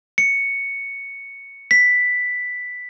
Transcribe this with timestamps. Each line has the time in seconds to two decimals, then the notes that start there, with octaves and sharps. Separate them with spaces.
0.18 C#7
1.71 B6